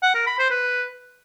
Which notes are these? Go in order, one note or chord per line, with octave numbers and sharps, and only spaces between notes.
F#5
A#4
B5
C5
B4